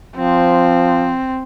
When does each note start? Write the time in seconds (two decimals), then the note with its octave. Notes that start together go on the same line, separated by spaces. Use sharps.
0.17 F3 C4